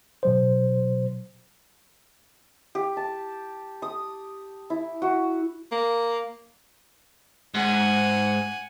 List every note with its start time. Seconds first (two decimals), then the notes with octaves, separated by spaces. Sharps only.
0.23 B2 F#3 C5
2.75 G4
2.97 A5
3.82 D#6
4.70 E4
5.02 F#4
5.72 A#3
7.55 G#2 F#5 G#5